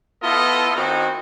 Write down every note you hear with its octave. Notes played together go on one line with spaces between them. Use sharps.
A3 B3 E4 F4 A4 D#5
A2 D#3 C4 D#4 F#4